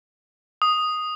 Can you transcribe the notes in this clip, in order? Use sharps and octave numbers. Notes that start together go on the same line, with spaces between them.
D#6